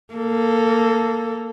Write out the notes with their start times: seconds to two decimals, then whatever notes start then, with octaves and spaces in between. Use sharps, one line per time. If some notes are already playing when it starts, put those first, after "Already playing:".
0.14 A#3 A4